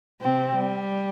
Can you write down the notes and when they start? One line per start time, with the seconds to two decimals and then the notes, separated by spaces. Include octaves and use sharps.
0.21 C3 C4
0.56 G3